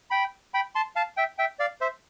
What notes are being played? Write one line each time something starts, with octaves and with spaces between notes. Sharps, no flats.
G5 B5
G5 B5
A5 C6
F5 A5
E5 G5
E5 G5
D5 F5
C5 E5